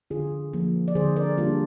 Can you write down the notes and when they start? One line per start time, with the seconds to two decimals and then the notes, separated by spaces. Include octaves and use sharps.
0.10 D3 F4 G#4
0.53 F3 A#3
0.88 D5
0.95 D3 G#4 C5
1.16 A#4 D5
1.38 G3 A#3 D4 F4